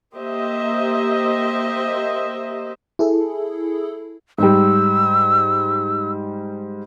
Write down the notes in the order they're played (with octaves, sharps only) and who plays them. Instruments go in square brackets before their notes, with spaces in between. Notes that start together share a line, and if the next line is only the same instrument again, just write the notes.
[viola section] A#3 G4 C5 D#5 E5
[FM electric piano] E4 G#4 A4
[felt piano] G#2 G3 [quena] E6